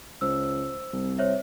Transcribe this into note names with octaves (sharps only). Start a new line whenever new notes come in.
C#2 C5 E6
C2
C5 C#5 E5